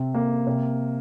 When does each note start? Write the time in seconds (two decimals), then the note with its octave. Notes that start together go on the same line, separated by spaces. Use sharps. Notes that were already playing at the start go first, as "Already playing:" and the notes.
Already playing: C3
0.14 A#3
0.47 C3